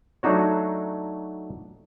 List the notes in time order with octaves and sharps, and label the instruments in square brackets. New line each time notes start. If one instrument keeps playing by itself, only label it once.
[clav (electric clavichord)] F#3 A3 D4 D#4 F#4 C#5